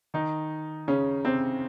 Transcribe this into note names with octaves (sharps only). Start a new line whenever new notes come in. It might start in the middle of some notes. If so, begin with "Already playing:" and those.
D#3 D#4
C#3 C#4
C3 C4